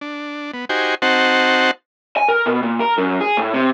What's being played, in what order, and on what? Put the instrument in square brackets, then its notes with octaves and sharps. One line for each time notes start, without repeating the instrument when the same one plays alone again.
[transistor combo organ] D4
B3
D#4 F#4 G4 C5 G#5
C4 D#4 F#4 C5 F#5 A5
[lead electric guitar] G#5
A#4
B2
A#2
A#4
F#2
G#4
A2
C3